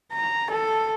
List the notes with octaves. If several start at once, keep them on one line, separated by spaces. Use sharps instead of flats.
A#5
A4